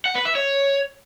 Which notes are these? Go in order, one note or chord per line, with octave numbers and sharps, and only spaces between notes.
F#5
B4
E5
C#5